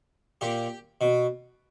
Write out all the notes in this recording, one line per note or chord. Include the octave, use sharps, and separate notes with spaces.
A#2 G4
B2